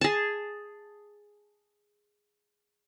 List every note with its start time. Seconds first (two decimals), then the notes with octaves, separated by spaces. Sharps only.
0.01 G#4 A5